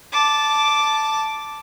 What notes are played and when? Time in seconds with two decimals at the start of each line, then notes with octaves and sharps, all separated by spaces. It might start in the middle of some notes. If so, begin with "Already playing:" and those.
0.12 A5 D6